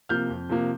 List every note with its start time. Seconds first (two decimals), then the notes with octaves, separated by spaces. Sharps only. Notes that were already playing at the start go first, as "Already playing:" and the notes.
0.09 C3 F3 A#3 F6 G6
0.29 F2
0.50 C3 F3 A#3